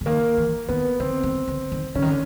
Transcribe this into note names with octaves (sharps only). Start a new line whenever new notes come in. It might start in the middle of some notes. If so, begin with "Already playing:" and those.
D3
D#3 A#3
E3
D#3 B3
D3 C4
D#3
D3
D#3
D3 C#4
D#3
D3